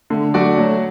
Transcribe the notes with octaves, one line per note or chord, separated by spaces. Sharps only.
D3 A3
F#3 A3 F#4 D5
F#3 A3